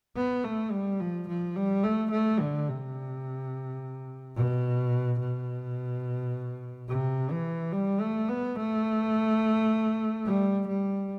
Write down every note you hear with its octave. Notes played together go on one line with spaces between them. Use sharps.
B3
A3
G3
F3
F3
G3
A3
A3
D3
C3
B2
B2
C3
E3
G3
A3
B3
A3
G3
G3